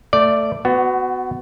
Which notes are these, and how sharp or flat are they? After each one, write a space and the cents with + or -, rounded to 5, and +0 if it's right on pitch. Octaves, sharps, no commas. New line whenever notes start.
A3 +15 D5 +0
B3 +25 F#4 +0